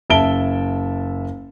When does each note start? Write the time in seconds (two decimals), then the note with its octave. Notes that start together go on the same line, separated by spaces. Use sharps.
0.10 F#1 E5 A5 D7 G7